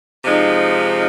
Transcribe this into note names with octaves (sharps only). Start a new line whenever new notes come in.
C3 F3 G#3 D#4